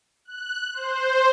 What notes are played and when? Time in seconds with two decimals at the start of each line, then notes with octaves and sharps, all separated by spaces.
0.25 F#6
0.74 C5